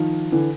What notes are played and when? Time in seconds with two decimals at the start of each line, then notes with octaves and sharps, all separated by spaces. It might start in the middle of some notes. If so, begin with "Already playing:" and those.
Already playing: D#3 F3
0.32 D3 E3